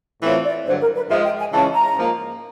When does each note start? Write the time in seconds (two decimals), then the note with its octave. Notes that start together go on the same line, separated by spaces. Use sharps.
0.22 A2 E3 A3 C4 F4 C#5
0.44 D5
0.66 G2 D3 F#3 C5
0.80 A#4
0.95 B4
1.09 G#2 F3 G#3 E5
1.23 G5
1.38 G#5
1.52 C#3 E3 G#3 C#4 F4 A5
1.74 A#5
1.96 G#2 F3 A#3